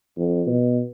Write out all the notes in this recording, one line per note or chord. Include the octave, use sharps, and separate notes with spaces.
F2
B2